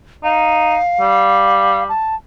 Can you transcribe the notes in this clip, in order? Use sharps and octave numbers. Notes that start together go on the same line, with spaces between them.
D#4 F5
G3
A5